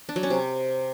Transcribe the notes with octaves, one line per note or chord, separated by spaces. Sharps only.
D4
F#3
C#4
C3